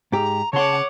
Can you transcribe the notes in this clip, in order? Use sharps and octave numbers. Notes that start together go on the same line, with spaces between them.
G#2 G4 A#5
C#3 C#5 F#5 A5 C6 D6